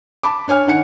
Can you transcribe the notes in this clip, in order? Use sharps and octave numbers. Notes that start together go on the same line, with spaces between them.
A5 B5 D6
D4 C#5 G#5 F6
D#3 F#5 C#7